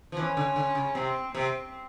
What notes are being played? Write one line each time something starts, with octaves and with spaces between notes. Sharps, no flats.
F3
E3 C#4
D3
D3
C#3
C3 C4
C3 C4